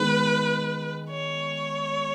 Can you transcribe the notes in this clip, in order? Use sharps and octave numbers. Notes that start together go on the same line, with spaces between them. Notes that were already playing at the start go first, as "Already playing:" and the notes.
Already playing: D#3 G#3 B3 B4
C#5